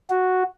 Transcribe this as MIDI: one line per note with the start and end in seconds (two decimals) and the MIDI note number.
0.10 0.43 66